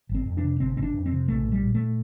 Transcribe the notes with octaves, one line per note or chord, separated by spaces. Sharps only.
G1
C4
F2
D4
C3
G1 C4
G1 C4
D4
F2
C4
C3
A#1 A3
A#2
G3
A#2
A3